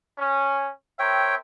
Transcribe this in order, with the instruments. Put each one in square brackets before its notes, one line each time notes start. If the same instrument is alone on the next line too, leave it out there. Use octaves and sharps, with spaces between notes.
[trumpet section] C#4
[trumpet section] C4 A#4 E5 [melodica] C#5 G5